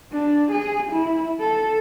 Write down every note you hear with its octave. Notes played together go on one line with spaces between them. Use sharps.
D4
G#4
E4
A4